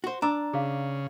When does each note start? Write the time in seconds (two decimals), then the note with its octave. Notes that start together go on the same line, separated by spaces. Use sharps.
0.04 F#4 C5
0.22 D4 A#5 D6 E6
0.54 C#3 G#4 F5